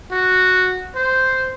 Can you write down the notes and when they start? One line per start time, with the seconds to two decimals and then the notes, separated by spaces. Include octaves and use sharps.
0.11 F#4
0.95 C5